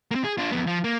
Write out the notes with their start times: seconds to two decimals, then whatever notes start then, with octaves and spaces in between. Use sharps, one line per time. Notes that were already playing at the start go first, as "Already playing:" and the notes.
0.11 A#3 C4
0.24 G#4
0.38 D4 F4
0.52 F2 B3
0.67 F3
0.84 A#3